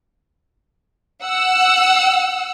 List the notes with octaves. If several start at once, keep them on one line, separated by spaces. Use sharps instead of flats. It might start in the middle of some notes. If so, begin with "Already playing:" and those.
F#5 E6